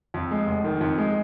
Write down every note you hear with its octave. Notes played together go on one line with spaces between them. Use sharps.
F2
G#3
F1
D#3
F2
G#3